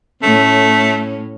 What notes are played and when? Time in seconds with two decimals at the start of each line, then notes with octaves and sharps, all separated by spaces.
0.23 A2 A3 C#4